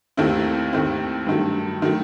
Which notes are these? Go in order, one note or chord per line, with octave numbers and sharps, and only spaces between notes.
D#2 D#3 A3 C4 E4
D#2 D#3 A3 C4 E4
G2 D#3 F#3 A3
D#3 F#3 A3